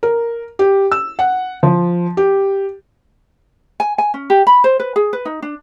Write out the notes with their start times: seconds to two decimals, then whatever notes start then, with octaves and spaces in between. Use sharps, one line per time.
0.03 A#4
0.59 G4
0.92 E6
1.19 F#5
1.63 F3
2.17 G4
3.80 G#5
3.98 G#5
4.14 C#4
4.30 G4
4.47 B5
4.64 C5
4.80 B4
4.96 G#4
5.13 B4
5.25 D#4
5.42 D4